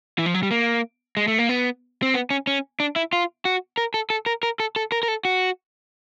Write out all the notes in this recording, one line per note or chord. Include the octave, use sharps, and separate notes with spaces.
E3
F3
F#3
G3
A#3
G#3
A3
A#3
B3
C4
B3
C#4
C#4
D4
E4
F4
F#4
A#4
A4
A4
A#4
A#4
A4
A4
A#4
A#4
A4
F#4